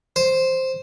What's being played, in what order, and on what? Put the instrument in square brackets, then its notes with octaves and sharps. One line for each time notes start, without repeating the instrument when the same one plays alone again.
[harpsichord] C5